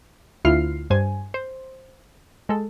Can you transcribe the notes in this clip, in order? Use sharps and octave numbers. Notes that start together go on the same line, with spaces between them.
D2 E4 F4 F6 C7
G2 C5 G#5
C5
G#3 A4